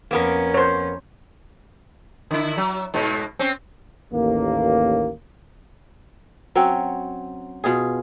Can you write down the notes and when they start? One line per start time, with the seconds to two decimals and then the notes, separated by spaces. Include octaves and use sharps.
0.11 F2 A#3 B3 C#4 A#4
0.54 C5 C#5
2.31 D3 E4
2.57 F#3
2.94 G#2 B2
3.39 C4 C#4
4.13 A1 D#2 A#3
6.55 F#3 C4 C#4
7.64 B2 F4 G#4